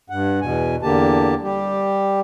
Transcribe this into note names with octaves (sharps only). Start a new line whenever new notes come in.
G2 F#5
E2 B2 G#5
E2 D3 A#3 G4 A5
G3 G4